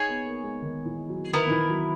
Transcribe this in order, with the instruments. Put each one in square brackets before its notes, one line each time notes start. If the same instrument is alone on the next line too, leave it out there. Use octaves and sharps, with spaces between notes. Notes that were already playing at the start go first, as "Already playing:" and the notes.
Already playing: [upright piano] D#4 [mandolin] G#4 C#5 G#5
[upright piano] B3
A#3
G#3
D#3
E3
F#3
[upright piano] D#3 [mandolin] B3 E4 A#4
[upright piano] D#3
E3
F#3